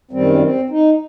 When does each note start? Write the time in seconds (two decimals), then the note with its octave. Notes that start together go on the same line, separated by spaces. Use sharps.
0.11 F#2 D#3 G3 C4
0.41 C4
0.70 D#4